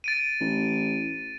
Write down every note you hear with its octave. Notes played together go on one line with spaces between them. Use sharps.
A6 D7 D#7
A1